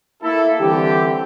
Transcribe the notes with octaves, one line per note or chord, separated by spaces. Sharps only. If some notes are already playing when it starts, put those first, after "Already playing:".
A#3 E4 A4
D3 E3 G3 C4 G4